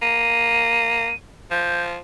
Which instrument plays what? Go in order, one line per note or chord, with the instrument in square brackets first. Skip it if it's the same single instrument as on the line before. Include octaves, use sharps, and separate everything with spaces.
[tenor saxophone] A#3 [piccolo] D#7
[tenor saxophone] F3 [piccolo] G6